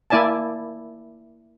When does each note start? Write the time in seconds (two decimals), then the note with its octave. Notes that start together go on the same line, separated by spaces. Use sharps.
0.10 A#3 E4 D5 G#5 A5